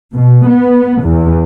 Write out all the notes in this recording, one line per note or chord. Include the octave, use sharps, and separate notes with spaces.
B2
B3
E2